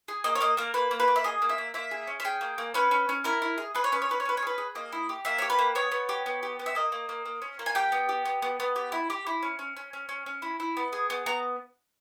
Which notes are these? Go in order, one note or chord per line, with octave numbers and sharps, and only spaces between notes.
G#4
A#3 D#5
C#5
A#3 D#5
A#3 A#4
A#3 B4
A#3
B4
A#3
E5
G#4 D#5
A#3
E5
A#3
A#3 E5
G#4
C#4
E5
G#4 G5
A#3
A#3
C#4 B4
C#4
C#4
E4 A#4
E4
G#4
G#4 B4
C#5
C#4 B4
C#5
C#4 B4
C#5
C#4 B4
C#5
G#4 B4
G#4
A#3 D#5
E4
G4
A#3 E5
G4 C#5
B4
A#3
B3 C#5
B3
G4
B3
G4
B3
E5
A#3 D#5
A#3
A#3
A#3
C#4
A#3
G#5
G4 G5
B3
G4
B3
B3
B3
G4
E4
G4
E4
C#4
C#4
C#4
C#4
C#4
C#4
E4
E4
B3
G#4
B3
B3 A#5